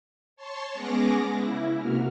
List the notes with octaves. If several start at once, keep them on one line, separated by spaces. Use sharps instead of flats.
C#5 A5 C6 C#6
G#3 B3 C#4 G#4 D6 A#6
C#3 E4
C3 A#3 F#4 F6